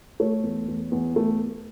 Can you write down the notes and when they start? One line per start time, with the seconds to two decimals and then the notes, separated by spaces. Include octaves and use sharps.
0.20 A3 C#5
0.43 E2
0.68 E2
0.92 E2
1.16 A3